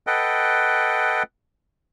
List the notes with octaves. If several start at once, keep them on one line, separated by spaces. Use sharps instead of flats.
A4 B4 D#5 F#5 G5